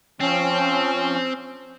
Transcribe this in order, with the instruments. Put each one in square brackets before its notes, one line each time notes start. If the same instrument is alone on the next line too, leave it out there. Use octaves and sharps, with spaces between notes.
[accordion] F3 C#4 [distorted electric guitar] C4